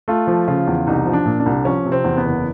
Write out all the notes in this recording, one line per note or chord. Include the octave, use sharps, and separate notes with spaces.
A3 F4
F3
C#3 F4
E2
C2 D#4
F3
D4
A#2
D4
C2
F3 C#4
C3
C4
E2
B3
F#1